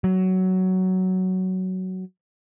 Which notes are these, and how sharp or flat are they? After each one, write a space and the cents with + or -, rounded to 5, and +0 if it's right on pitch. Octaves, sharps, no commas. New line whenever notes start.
F#3 +10